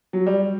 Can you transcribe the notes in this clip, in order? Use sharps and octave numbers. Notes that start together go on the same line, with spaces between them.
F#3
G3